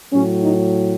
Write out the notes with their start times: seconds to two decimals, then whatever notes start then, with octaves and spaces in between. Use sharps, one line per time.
0.13 A2 F#3 C#4
0.42 D#4